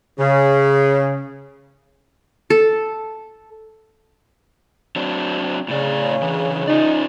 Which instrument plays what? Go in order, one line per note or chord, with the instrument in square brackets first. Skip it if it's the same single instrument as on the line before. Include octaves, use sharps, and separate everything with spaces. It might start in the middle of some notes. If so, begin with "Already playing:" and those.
[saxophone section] C#3
[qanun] A4
[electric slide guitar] F#3 C4 D4
[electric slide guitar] A2 D5 [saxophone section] C#3
[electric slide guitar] D3 E3
[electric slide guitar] C#4 F4 D5 [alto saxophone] D#4